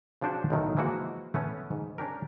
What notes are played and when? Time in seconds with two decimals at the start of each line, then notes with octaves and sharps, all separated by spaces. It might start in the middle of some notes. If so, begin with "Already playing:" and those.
0.21 C#3 F3 C#4 D4 F#4 C5
0.50 B1 A2 D#3 F#3
0.77 E3 F3 G#3 A#3 F#4
1.34 A3 B3 C#4
1.71 G#2
1.98 C#4 D4 G4 A#4